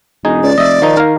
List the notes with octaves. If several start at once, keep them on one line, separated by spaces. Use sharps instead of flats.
E1 D#4 G#4
C#2 D5
F1 D#5 E5
D#3 F3 D#4
A#4 F5